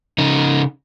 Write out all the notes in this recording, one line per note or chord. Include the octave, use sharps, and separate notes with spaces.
C#3 D#4